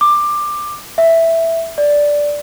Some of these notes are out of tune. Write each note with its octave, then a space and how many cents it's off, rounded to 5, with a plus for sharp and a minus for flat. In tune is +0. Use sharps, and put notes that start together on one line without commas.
D6 +15
E5 +0
D5 -5